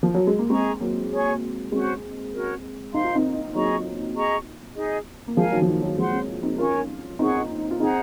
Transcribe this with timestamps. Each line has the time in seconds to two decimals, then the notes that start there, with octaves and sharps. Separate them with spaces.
0.03 F3
0.14 F#3
0.27 G#3
0.39 A#3
0.50 G#3 C4 G#4 D#5 A#5 C#6
0.80 F#3 A#3
1.11 G#4 C#5 G#5 C#6
1.72 G#3 C4 C#4 F#4 C5
2.33 C#4 F#4 A#4 C#5
2.93 D#4 C5 F5 C6
3.04 F4
3.15 C4 D#4
3.54 F#3 A#3 G#4 D#5 A#5 C#6
4.15 G#4 D#5 A#5 C#6
4.77 D#4 G#4 D#5
5.28 A#3
5.37 F3 G#3 A#4 F5 G#5
5.52 D#3 F#3
5.62 F3
5.68 D#3
5.82 D#3 F#3
5.98 F3 G#3 C5 F#5 C6
6.13 G#3 C4
6.43 C4 D#4
6.58 C#4 F4 A#4 C#5 G#5 C#6
7.19 C4 D#4 G#4 C#5 F#5 C#6
7.71 F4
7.80 C4 D#4 G#4 C5 F#5 A#5